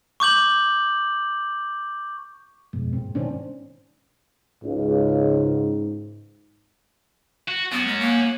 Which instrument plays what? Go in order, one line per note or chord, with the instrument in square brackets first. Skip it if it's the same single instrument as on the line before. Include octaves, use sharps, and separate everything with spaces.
[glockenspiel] C#6 D6 G6 F#7
[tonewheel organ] F2 G#2 B2 [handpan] G#3
[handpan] A#2 C4
[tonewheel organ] G#2 B2 D#3 [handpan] C#4 D4 C5
[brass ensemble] C#2 [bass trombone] G#2
[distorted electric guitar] F#4
[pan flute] B3 [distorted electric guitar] C#4 F#4
[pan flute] G#3
A#3